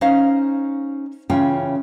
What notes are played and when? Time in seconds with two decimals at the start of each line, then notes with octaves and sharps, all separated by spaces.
0.01 C#4 D#4 C5 D#5 F5
1.30 C#3 E3 C#4 F4 G5 G#5